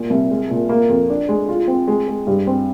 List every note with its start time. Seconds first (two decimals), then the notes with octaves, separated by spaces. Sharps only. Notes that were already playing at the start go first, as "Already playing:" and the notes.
Already playing: A#2
0.10 C2
0.31 G#3
0.50 A#2
0.69 A#3
0.89 F2
1.10 D4
1.29 G#3
1.49 F4
1.68 C4
1.88 G#3
2.08 G#3
2.27 G2
2.47 C4